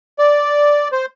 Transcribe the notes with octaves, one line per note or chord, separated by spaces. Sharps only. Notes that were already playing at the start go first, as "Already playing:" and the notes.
D5
C5